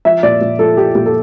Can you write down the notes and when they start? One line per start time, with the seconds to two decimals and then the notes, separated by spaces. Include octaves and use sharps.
0.05 F3 E5
0.23 A#2 D5
0.41 A#2
0.59 F3 A4
0.77 F3 G4
0.95 A#2 G4
1.06 A4